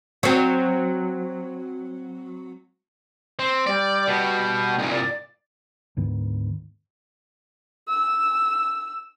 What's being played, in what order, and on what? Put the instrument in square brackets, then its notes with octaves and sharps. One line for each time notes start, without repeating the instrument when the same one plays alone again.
[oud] F#3 C4
[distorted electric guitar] C4
[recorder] G3 [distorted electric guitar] D5
[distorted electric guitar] B2
[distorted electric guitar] C2 A#2 [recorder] D#4
[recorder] D5
[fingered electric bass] D2 G#2 D#3 B3
[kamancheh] E6